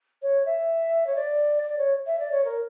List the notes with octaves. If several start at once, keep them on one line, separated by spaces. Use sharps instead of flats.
C#5
E5
C#5
D5
D5
C#5
E5
D5
C#5
A#4